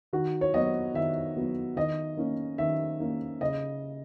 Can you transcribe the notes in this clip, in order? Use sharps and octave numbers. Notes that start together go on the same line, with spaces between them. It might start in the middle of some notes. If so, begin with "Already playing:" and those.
D#3 F#4
C#5
F#3 B3 D#5
D#3 E5
F#3 B3
D#3 D#5
A#3 C#4
D#3 E5
A#3 C#4
C#3 D#5